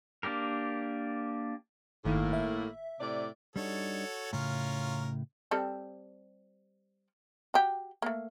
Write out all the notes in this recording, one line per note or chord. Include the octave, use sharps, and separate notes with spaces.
A#3 D4 G4 A#4
G1 A2 D#3 A#3
E5
A2 C3 D5
G3 D4 D#4 F#4 A4 C#5
A2 C#3 C#4 F4 A#4
G3 C4 A4
F#4 G4
A3 A#3